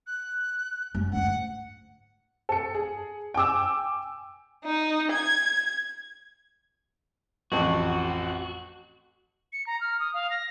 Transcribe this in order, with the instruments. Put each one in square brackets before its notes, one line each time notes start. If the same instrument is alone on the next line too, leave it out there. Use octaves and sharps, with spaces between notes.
[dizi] F#6
[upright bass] F#2 G#3
[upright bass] D2 G#2 [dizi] F#5
[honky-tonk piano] A4 C#7
G#4
G5 G#5 D6 E6
[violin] D#4
G#6
[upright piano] A1 F2 [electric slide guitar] F#4
[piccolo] C#7
A#5
F6
D#6
F5
A#6